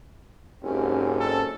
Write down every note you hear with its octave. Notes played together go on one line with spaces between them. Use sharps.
F#1 G#2 C4 C#4 G4
A4